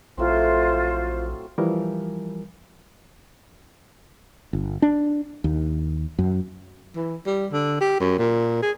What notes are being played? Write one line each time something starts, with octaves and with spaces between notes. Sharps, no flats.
A#1 A2 F#3 C4 F4 C5
E3 F3 G3 A#4
G1
D4
D#2
F#2
E3
G3
D3
G4
F#2
A#2
G#4